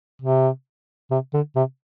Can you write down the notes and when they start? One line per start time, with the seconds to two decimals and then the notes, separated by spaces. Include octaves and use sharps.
0.22 C3
1.11 C3
1.34 D3
1.56 C3